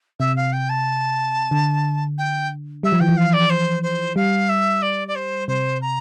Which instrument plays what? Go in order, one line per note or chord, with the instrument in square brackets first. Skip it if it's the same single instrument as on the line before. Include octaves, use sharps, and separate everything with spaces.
[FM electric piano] C3 [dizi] E5
[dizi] F5
G5
A5
[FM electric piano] D3
[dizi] G5
[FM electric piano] G3 [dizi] E5
[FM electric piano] F3
[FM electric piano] E3 [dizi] G5
[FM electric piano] F3
[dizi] F5
D5
C5
C5
[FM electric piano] G3 [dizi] F5
[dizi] E5
D5
D5
C5
[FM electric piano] C3 [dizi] C5
[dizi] A#5